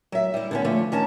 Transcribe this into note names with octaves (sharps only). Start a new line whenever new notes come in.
F#3 E5
G3 E4
D3 B3 C#4
D3 F3 A3
D#3 C#4 A5 A#5